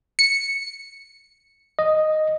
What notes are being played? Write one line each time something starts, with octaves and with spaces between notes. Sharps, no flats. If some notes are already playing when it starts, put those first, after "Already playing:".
C#7
D#5